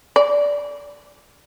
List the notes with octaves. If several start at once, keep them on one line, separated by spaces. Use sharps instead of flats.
D5